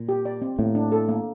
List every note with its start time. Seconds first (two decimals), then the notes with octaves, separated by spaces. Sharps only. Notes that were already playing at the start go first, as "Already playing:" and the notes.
Already playing: A#2
0.09 G4
0.25 D5
0.42 C4
0.59 A2 A#3
0.75 D4
0.92 A4
1.09 A#3